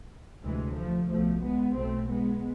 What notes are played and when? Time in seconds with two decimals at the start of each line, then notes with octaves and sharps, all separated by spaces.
0.44 D2 C3 E3 G#3
0.76 F3 A3
1.09 B1 B2 F3 A3
1.42 G#3 B3
1.75 B1 B2 A3 C4
2.09 G#3 B3